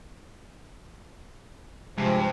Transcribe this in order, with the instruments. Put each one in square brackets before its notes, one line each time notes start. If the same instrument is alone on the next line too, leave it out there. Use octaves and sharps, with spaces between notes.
[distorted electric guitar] G2 [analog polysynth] C3 G#3 [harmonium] F3